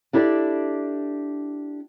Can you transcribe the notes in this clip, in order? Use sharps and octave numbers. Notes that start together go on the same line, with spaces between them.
D4 E4 G4 A4 B4 D5